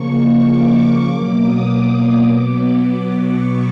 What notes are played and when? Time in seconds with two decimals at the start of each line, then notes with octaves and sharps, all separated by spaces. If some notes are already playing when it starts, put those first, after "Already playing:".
Already playing: C#3 F3 A#3 C#6
0.47 D6
1.08 B2 F#3 A#3 D6
1.39 D#6
1.69 D6
2.32 B2 F#3 B3
2.93 D6
3.25 C#6